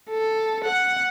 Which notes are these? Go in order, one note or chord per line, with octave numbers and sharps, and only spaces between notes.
A4
F#5